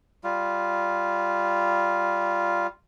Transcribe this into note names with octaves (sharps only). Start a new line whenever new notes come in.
G3 F4